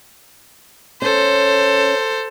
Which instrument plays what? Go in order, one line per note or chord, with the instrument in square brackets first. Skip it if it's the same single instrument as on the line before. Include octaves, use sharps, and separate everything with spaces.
[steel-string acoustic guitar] C#4 [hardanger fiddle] A4 C5